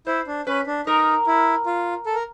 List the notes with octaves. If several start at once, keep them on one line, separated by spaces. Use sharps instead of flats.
E4 C5
D4
C#4 B4
D4
D#4 A#4
E4
F4
A4
A#4